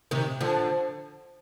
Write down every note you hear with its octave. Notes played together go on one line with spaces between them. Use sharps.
C3 D#3
D3 F3